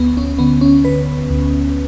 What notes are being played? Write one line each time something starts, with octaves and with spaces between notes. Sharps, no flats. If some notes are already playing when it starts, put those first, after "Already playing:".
Already playing: D2 B3
C#4
D3 B3
C#4
D3 B4
D2